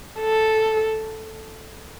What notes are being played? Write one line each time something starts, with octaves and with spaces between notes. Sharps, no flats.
A4